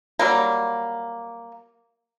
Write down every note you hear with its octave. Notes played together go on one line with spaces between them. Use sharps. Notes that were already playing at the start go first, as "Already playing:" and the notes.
F#3 G3 A#3